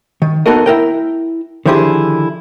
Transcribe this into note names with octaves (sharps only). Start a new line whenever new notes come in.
D#3
B3 D#4 F#4 A4 A#4 D#5
E4 A#4 G5
D3 D#3 F3 E4 G4 G#4